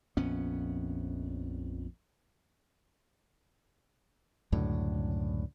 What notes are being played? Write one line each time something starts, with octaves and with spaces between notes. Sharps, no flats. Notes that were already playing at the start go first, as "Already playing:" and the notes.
A#1 F2 B3 C#4
C#2 F#2 A2 D3